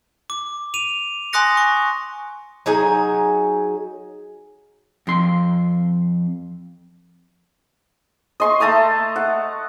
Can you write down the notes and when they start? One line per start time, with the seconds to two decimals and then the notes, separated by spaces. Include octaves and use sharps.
0.30 D6
0.74 D#7 F7
1.33 G#5 C6 D#6 F#6 A#6 C#7
1.57 C#6
2.66 F#3 D#4 G#4 G#5
5.07 F2 C6
8.40 D#5 C6 C#6
8.60 A3 A5 A#5 D#6
9.16 F#5